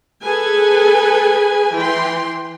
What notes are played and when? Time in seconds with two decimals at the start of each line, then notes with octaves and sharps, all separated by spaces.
0.23 G#4 A4 B4 G#5
1.75 E3 G5 C6